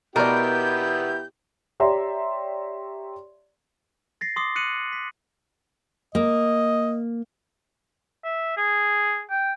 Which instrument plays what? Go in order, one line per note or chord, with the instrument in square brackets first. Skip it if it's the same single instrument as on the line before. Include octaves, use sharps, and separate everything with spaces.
[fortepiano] B2 D5 [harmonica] B3 E4 G4 [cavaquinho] A#4 [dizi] G6
[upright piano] G4 C#5 D5 E5 A#5 C6
[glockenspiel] A6 A#6 C7
C6 D6 D#6 C7
F#6 C#7 D#7 F#7
B6
[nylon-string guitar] A#3 [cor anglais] D#5
[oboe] E5
G#4
G5